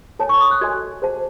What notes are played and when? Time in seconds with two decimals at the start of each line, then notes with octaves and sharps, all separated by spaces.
0.19 A4 C#5 G#5 A5
0.29 C#6
0.41 D#6
0.51 F#6
0.61 F#4 A4 D#5 G#5 G#6
1.02 G#4 C5 F#5 A5